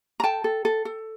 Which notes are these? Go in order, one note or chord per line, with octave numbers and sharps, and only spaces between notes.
A#5
A4 G5 A5
A4
A4
A4